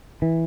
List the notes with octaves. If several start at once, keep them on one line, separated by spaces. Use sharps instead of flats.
E3